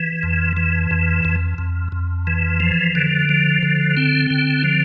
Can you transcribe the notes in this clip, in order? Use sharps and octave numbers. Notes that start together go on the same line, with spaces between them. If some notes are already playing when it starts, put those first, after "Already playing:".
Already playing: E3
F2
E3
F2
F2
F2
F2
E3
F3
D3
F3
D3
C4
D3
F3